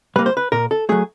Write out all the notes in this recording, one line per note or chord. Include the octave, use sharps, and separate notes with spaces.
G3 A#3 B4
C5
B4
A#2 A#4
A4
F#3 A3 G#4